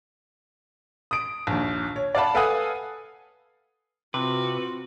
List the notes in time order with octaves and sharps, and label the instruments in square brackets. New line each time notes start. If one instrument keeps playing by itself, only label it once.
[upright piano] D#6 D7
A#1 D#2
C#5
D5 F5 F#5 A5 B5
A4 B4 F5 F#5 G#5 D#6
[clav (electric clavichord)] C3 [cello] C4 F#4 [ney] F4 [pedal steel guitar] B4